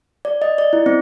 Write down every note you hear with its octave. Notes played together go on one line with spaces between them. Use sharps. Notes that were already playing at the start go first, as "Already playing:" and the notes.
D5
D#5
D5
E4
C4